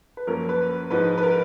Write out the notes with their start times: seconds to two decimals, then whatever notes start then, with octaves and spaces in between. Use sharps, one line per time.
0.17 B4
0.27 F#2 F3 A#3 C#4 A#4
0.49 B4
0.91 G#2 F3 G#3 D#4 B4
1.18 B4
1.23 A#4